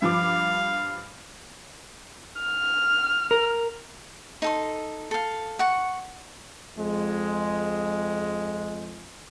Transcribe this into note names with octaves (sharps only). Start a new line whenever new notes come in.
G2 F3 F5 D6
F6
A#4
D#4 A4 C6
A4 F5
F#5 C#6
F2 G#3